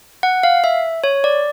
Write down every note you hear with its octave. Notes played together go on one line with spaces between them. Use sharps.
F#5
F5
E5
C#5
D5